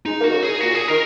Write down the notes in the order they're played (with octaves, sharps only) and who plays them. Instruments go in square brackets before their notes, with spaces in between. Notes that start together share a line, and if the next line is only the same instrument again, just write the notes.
[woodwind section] G#3 [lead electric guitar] D#4
[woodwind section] A#3
[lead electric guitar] F#4
[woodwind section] D#3
C#3
[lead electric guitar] G#4
[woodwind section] A#2 [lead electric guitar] F#4
[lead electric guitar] G#4
[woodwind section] D#3 [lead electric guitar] A#4